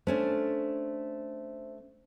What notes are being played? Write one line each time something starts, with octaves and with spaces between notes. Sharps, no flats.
A3 C#4 D4 C5